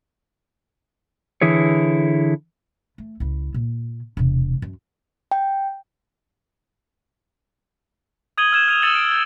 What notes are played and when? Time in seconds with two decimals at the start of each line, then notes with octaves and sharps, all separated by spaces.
1.41 D3 E3 E4 G#4 C#5
2.98 A3
3.20 C#2 E4
3.54 A#2
4.17 E1 C3
4.62 F#2
5.31 G5
8.38 D#6 G#6 D#7 F#7 G7
8.52 E6 F6 G6 G#6 E7
8.68 F6 D#7 F7
8.82 E6 A6 C#7 D#7 F7 F#7
8.95 D7
9.12 G6 G#6